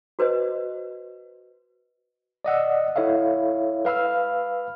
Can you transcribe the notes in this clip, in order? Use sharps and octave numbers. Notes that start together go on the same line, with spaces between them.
F#4 B4 C5 D#5
D5 D#5 F#5 E6
E4 A4 C#5 E5 F5
B4 F5 B5 E6 F6